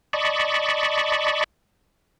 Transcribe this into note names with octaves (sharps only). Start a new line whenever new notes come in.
D5 D#5 A5 B5 C#6